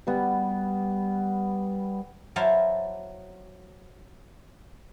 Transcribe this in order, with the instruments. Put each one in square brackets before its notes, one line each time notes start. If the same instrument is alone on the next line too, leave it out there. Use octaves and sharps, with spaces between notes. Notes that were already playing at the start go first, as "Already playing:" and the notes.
[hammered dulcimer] G3 B3
[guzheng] F#3 E4 C5 F5 A5